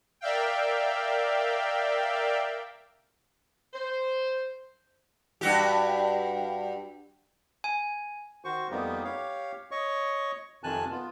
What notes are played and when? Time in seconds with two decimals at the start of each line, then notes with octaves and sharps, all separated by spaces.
0.21 A#4 D5 E5 F5 G5
3.74 C5
5.41 G2 F#4 G4
7.64 G#5
8.45 D#3 F#4 C5 C#6
8.71 F2 G3 A#3 B3 D#4 G4
9.04 G4 C#5 F5
9.71 C#5 D#5 C#6
10.64 F2 C3 D#3 G#5 A5 F#6
10.91 B3 F4